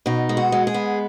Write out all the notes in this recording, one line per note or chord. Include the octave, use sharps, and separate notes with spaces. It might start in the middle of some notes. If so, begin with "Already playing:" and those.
B2 D#4
G#3
F#4
G#3
G#4
B3